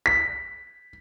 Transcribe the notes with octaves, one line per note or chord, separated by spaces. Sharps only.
B6